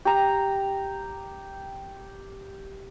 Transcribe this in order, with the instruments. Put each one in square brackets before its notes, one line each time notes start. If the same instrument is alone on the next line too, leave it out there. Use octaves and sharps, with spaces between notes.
[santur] G4 A#5